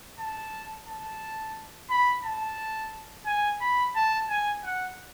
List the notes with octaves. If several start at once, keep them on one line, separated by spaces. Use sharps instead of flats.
A5
A5
B5
A5
G#5
B5
A5
G#5
F#5